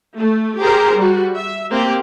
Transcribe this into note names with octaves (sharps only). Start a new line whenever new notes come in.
A3
G4 G#4 A#4 C5 A#5
G3 F#4
E5
A#3 C4 G4